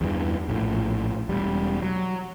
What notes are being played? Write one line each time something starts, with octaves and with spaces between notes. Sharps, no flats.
E2 G2 E3
A#1 A2
E1 G3
F#3